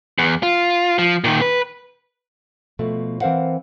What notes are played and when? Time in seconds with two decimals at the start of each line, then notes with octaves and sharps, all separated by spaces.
0.18 E2
0.43 F4
0.98 F3
1.24 A#2 D#3
1.41 B4
2.79 B2 F3 A3
3.21 E3 C4 A#4 C5 F5 F#5